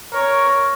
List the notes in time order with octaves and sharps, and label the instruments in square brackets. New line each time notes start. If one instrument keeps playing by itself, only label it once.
[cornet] A#4 [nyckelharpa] C#5